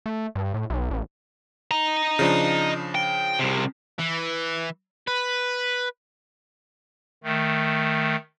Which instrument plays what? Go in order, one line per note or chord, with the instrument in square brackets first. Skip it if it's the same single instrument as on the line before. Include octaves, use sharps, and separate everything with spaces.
[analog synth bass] A3
G2
A2
B1
A1
[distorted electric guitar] D#5 A#5
[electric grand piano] C#3 F3 D4
[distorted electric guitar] G5
C2 C3
E3
B4
[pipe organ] D#3 A3